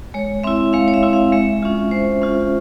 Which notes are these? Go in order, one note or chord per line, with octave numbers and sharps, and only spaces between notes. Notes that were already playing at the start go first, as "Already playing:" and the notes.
G#3 C#5
C4 E4 E5
G#3 F5
C#5
E5
C4 E4
F5
G#3 E5
C#4 F4
G#3 C5
C#4 F4